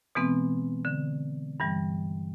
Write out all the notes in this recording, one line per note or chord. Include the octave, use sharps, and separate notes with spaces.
B2 E3 G#3 B3 C4
D3
G2 E3 G3